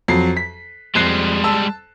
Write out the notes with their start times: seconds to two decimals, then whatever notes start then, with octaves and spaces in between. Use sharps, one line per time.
0.08 F2 F#3 C7
0.37 B6
0.95 F2 G3 G#3 F#6 C7
1.44 A5 E6